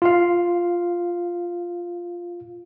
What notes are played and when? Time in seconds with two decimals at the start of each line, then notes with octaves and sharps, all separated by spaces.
0.02 F4 F5